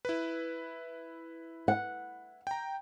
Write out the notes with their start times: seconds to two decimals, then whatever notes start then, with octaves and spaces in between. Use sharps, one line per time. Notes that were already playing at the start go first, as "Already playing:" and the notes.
0.05 E4 B4
1.68 F#5
2.47 G5 A#5